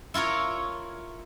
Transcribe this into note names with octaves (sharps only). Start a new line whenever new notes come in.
E4 F4 A#4 C#5